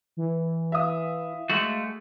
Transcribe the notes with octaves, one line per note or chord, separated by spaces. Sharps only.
E3
E5 F5 D#6
G#3 A3 F#4